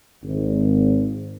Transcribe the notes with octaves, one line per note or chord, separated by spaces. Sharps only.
G#1